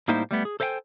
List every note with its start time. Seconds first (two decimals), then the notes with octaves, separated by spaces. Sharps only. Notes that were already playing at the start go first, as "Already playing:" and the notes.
0.08 A2 G3 A#3 D#4 E4 C5
0.31 G3 A3 B3
0.45 G#4
0.60 A4 C5 D#5 F5 G5 G#5